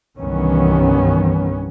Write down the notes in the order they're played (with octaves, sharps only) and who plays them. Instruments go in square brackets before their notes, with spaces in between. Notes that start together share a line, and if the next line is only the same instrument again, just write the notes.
[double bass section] C2 G2 D#3 E3 B3 C#4